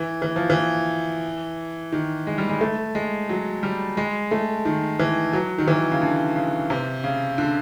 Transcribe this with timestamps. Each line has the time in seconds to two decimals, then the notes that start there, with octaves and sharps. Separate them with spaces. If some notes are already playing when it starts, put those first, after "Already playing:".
Already playing: E3
0.22 E3
0.36 F3
0.50 E3
1.92 D#3
2.27 G#3
2.38 G3
2.49 G#3
2.61 A3
2.95 G#3
3.29 F#3
3.63 G3
3.97 G#3
4.31 A3
4.65 D#3
4.99 E3
5.33 F#3
5.58 D#3
5.68 E3
5.92 C#3
6.02 D3
6.36 C#3
6.70 C3
7.04 C#3
7.38 D3